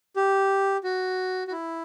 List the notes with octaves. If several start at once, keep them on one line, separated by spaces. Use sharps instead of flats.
G4
F#4
F#4
E4